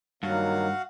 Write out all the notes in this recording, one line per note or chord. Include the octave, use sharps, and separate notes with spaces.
G2 D#3 F#3 A#3 F#4 F5 F#5